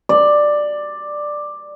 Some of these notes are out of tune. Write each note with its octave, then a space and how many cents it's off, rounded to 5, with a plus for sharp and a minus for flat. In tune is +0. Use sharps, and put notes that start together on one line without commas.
D5 +10